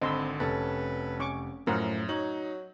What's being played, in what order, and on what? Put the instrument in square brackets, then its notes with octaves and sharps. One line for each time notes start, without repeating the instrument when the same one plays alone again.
[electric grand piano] G#1 D3 [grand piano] C4 B5 [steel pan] D#5 C6 E6
[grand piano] F1 [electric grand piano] C#4 A4 A5 [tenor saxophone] B4
[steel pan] C#4 C#6 D6
[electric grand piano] F#2 [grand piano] A2 [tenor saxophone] F3 [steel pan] A#4 F#5
[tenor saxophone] F#3 [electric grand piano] D#4 [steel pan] C#5 [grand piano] F#7